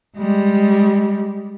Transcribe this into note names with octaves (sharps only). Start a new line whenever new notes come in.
G3 G#3